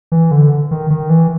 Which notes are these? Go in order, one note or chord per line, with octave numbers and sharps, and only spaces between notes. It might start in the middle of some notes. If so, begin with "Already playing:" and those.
E3
D3
D#3
D#3
E3